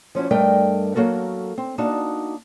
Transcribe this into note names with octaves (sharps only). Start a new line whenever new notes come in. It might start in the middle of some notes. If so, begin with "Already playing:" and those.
F3 C#4 E4 F#4
G2 G3 A3 A#4 D#5 G5
F#3 A#3 F#4 A4 A#4
C4
A#3 D4 D#4 F#4 A5